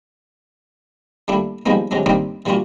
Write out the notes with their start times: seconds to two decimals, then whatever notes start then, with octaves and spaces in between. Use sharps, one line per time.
1.28 G3 A3 A#3 D4 E4
1.66 F3 G3 G#3 A#3 B3 D#4
1.91 C3 F#3 G#3 D4
2.06 G3 A#3 C4 D4 D#4
2.46 E3 G3 A#3 D4 F4 F#4